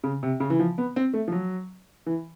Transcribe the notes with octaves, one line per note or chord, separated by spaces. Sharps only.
C#3
C3
C#3
E3
F3
B3
C4
A3
F3
F#3
E3